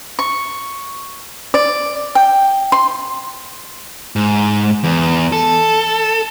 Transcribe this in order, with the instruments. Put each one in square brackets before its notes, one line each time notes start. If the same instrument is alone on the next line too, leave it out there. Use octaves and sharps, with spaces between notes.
[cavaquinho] C#6
D5
G5
C6
[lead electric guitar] G#2
E2
A4